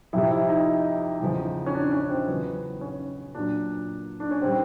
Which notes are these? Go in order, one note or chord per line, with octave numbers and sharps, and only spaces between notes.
F2 C3 F3 E4
E4
D#4
E2 C#3 F3
C#4
D4
C#4
C4
E2 C#3 F#3 B3
C#4
A#2 F#3 D4
D4
C#4
D#3 G3 C4